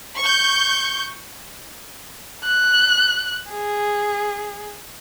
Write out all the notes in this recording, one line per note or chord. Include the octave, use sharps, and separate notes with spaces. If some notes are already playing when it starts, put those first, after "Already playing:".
C#6 G6
F#6
G#4